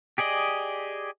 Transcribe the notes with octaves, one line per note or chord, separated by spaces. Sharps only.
G4 G#4 D5 D#5